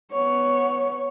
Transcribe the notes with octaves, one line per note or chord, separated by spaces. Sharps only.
B3 C#5